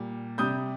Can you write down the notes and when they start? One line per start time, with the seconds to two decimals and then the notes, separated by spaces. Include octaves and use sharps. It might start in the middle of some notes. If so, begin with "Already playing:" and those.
Already playing: A#2 G3
0.38 C3 G3 D#6 G6